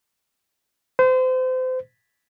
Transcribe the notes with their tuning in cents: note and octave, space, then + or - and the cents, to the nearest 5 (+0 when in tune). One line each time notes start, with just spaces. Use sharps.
C5 -35